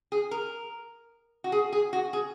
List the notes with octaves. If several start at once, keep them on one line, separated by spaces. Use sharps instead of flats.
G#4
A#4
F#4
G#4
G#4
F#4
G#4